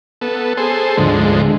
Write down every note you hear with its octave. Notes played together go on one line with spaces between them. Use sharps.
B3 A4
G#4 A4 C5
D2 G#2 D3 F3 G#3